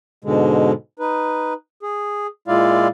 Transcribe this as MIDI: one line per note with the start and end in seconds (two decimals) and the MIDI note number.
0.24 0.72 44
0.24 0.72 47
0.24 0.72 50
0.24 0.72 56
0.99 1.53 63
0.99 1.53 71
1.83 2.27 68
2.48 2.88 46
2.48 2.88 56
2.48 2.88 64
2.48 2.88 65
2.48 2.88 74
2.48 2.88 77